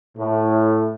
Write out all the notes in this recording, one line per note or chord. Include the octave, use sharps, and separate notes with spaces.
A2